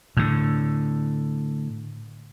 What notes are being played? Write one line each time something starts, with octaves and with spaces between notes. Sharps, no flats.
A2 D3